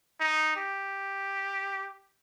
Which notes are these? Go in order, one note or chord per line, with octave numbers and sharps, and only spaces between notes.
D#4
G4